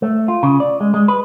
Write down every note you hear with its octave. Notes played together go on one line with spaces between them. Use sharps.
A3
F4
C#3
D5
G#3
G#3
B4